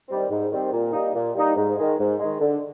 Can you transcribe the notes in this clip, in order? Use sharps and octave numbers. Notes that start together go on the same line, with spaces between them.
D#3 G3 C4
G#2
D#3 G3 C4
A#2
G3 A#3 D#4
A#2
G3 A#3 D#4
G#2
D#3 G#3
G#2
D#3 G#3
D3